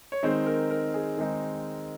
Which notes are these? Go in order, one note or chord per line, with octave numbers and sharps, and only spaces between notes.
C#5
D#3 G#3 C4 D#4 C5
A#4
A#4
G#4
D#3 G#3 C4 D#4